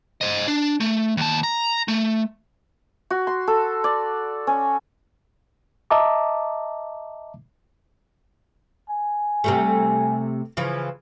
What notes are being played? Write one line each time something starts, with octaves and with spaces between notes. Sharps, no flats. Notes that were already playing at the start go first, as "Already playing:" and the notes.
C5 D#5
D4
A3
D#2 A5
A#5
A3
F#4
C6
A4
D5
C#4
D#5 E5 A5 A#5 D6
G#5
C3 G3 A3
C#3 E3 F3